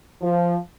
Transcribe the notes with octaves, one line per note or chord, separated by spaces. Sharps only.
F3